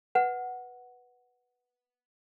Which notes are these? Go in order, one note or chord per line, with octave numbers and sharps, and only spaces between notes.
B4 F#5